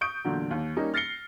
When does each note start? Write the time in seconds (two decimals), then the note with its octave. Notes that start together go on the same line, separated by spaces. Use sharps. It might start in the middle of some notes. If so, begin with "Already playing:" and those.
0.01 C#6 D#6 G6 D7
0.24 E2 A#2 D3 F#3
0.51 D#2
0.76 G3 A#3 C#4 D#4
0.94 F6 A6 A#6 C7 C#7 G7